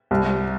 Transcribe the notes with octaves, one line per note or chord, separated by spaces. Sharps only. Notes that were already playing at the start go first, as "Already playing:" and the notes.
C2